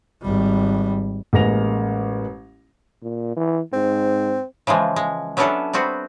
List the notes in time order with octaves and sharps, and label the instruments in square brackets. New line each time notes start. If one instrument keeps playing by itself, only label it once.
[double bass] G#1 G3
[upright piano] A1 G#3 A#3 A#6 F7
[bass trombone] A#2
E3
[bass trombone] G#2 [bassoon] C4
[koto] C#3 E3 F3 G#3
G#3
F#3 B3 C#4 D4 E4 A4
G3 B3 C4 F#4